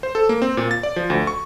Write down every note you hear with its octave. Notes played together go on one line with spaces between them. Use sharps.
C5
A4
A#3
C4
A#2
A6
D5
F3
D2
C#6